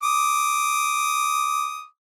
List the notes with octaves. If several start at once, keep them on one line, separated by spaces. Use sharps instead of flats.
D6 D#6